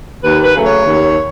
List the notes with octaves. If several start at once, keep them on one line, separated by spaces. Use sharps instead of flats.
D#2 B4
B4
C#3 F#3 A3
C#5
D#2